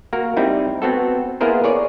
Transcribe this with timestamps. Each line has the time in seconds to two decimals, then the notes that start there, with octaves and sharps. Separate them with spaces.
0.13 A#3 F#4 A#4
0.37 G3 C4 D#4 E4
0.82 B3 C4 F#4 A4
1.41 A#3 B3 E4 G#4 A#4 C5
1.64 G#4 C#5 D5